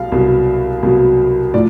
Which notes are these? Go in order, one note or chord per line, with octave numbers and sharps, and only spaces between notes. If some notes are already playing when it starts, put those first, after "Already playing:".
Already playing: C2 B2 F#3 F5
C2 B2 F#3
C2 B2 F#3
A2 F3 D5